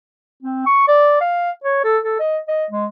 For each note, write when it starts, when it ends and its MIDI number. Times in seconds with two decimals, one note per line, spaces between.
0.43 0.61 60
0.66 0.83 85
0.88 1.17 74
1.21 1.51 77
1.64 1.82 73
1.84 1.98 69
2.04 2.17 69
2.19 2.38 75
2.48 2.65 75
2.71 2.86 56